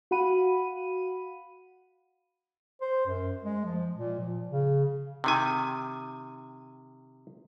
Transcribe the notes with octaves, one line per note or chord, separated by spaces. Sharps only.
F#4 F5 F#5 B5 D#7
C5
F#2
G#3
F3
A#2
F3
C#3
C3 D#3 G#5